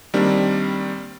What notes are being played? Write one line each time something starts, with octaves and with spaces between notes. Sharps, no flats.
D#3 G3 A#3 C4 D4